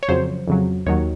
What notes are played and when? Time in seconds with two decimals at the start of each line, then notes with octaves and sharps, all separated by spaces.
0.03 C#5
0.08 F2 C#3 F#3 C5
0.48 F2 C#3 F#3
0.86 D#2 D#3 F#3 C#5